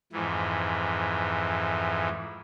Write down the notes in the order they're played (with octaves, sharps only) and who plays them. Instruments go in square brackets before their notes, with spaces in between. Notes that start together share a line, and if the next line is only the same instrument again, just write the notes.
[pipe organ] F2 G#2 E3